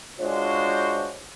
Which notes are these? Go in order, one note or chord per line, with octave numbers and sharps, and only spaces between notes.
G#3 D4 F4 F#4 C5 C#5